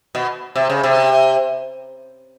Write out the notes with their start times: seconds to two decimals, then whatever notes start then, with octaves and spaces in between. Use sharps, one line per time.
0.15 B2
0.55 C3
0.70 C#3
0.83 C3